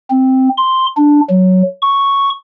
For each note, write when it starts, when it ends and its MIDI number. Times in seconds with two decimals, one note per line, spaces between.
0.10 0.49 60
0.58 0.87 84
0.97 1.21 62
1.30 1.63 54
1.82 2.30 85